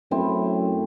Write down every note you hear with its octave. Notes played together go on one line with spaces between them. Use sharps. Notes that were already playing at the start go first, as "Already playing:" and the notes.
F#2 A3 C4 E4